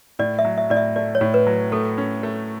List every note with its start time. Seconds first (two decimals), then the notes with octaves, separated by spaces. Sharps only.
0.19 A2 D5
0.39 E5
0.45 F#3
0.58 E5
0.70 A2 D5
0.77 E5
0.96 A3 D5
1.15 C#5
1.21 A2
1.34 B4
1.47 F#3
1.72 A3 A4
1.98 C#4
2.23 A3